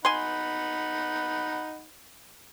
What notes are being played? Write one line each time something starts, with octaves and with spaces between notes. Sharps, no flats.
D#4 F#5 G#5 B5 C6